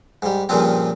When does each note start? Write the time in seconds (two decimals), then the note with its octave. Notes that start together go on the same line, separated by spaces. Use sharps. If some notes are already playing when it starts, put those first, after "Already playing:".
0.22 G#2 G3
0.49 G2 A#2 C#3 F3 C4